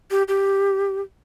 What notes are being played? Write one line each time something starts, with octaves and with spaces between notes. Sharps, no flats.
G4
G4